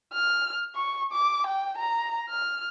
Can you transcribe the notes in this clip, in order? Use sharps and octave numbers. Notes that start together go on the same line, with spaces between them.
F6
C#6
D6
G5
A#5
F6